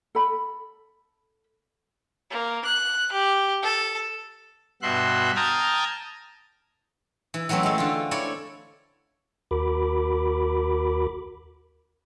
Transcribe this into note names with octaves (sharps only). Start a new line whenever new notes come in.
A4 B5
A#3
F#6
G4
A4
G2 B2 F#4 E5 C6 F#6
G5 A5 A#5 D#6 F6 G#6
E3
E3 F#3 A3 C4 C#4
G#3 A3
D3 F4
E4 A4 C#5 D5
D#2 F#4 A#4 B5 D6